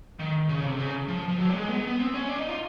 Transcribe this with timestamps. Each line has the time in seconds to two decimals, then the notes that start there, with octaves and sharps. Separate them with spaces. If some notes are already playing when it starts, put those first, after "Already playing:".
0.19 D#3
0.49 C#3
0.65 C3
0.80 C#3
1.08 F3
1.28 F3
1.38 F#3
1.49 G3
1.53 G#3
1.69 B3
1.87 B3
1.99 C4
2.14 C#4
2.29 D4
2.39 D#4
2.48 F4